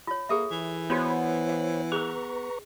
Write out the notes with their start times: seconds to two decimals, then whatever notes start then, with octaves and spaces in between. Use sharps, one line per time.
0.07 F4 C#5
0.29 A#3 G#4 A4 E5
0.51 E3
0.90 B3 F4 F#4 C5 C#5
1.49 F5 F#5
1.92 G#4 A#4 B4 A#5 C#6